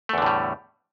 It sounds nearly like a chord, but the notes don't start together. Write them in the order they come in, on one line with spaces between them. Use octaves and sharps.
A3 E2 D3 A2 G3